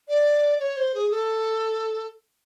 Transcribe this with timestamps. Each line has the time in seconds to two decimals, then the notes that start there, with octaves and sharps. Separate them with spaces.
0.08 D5
0.60 C#5
0.77 C5
0.94 G#4
1.11 A4